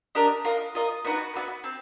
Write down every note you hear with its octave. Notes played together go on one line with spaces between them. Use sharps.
D4 G4 A#4 D#5
F4 A#4 D#5
F4 A#4 D#5
B3 D#4 F#4 B4
B3 D#4 F#4 B4
C4